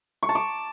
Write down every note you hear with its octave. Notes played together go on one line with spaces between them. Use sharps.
C#6
A5
D6